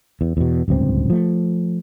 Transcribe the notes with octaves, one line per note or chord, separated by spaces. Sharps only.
E2
E2 B2
D1 C#2 G2 C4
F3 A3